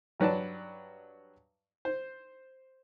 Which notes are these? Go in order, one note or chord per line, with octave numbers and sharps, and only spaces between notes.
G2 F#3 B4 D5 A5
C5